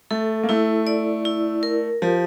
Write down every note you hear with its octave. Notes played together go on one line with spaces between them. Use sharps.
A3 A4
A#3
A3 E4
D5
E4
A#4
F3 G4